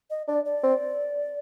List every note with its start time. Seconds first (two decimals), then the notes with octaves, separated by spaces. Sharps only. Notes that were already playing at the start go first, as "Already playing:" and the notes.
0.10 D#5
0.28 D4 D5
0.45 D5
0.63 C4